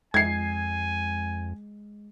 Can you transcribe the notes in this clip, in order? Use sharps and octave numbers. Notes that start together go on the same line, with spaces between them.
F2 G#3 G#5 G#6 C7